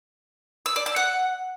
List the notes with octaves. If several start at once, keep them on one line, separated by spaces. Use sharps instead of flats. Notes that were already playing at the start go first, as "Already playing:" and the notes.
E6
D5
E6
F#5